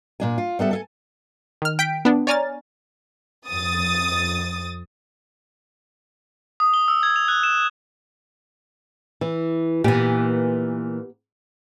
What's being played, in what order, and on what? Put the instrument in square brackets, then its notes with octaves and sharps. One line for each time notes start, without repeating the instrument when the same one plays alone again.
[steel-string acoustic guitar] A#2 D4 G#5
F4
G3 B3 A4 E5
A4 E5 G#5
[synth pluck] D#3 F6
G5 G6 B6 D7
B3 D4
C#5 D5 G#5 A#5 F6 A6
[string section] F2 D#6 A6
[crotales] D#6
G7
E6
G#6
F7
F#6
E7
[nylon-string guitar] E3
[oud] A#2 E3 [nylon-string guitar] B3 G4